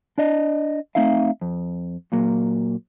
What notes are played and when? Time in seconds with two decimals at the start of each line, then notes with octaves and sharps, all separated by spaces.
0.18 D4 D5 D#5
0.95 A3 C4 D#4 E5 F5
1.41 F2
2.12 A#2 F#3 A#3